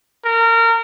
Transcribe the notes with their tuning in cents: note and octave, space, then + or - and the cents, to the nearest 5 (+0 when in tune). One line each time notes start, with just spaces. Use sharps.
A#4 -25